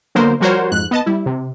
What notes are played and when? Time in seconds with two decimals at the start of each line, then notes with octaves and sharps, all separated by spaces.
0.15 D3 F#3 A#3 B3 A#4 C5
0.40 F3 G3 F#4 A#4 C5 C#5
0.71 F2 G#2 F#6
0.91 B3 D#5 A5
1.06 G3 E4
1.26 C3